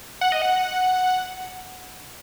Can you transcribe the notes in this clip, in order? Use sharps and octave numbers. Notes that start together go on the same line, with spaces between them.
F#5
D#5
F#5